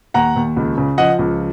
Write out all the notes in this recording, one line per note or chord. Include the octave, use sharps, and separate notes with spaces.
D#2 F#5 A#5
D#2
C#2
C#3
F3 D#5 F#5
C#2